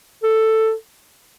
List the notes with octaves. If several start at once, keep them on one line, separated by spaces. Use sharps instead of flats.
A4